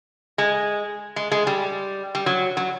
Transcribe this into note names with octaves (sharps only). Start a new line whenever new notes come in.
G#3
G#3
G#3
G3
G3
F#3
F#3